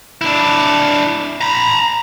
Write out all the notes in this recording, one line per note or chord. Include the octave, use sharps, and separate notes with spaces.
D4 E4
A#5 B5